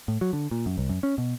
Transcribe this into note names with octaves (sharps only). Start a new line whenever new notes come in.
A2
F#3
D3
A#2
F#2
C2
F#2
C#4
B2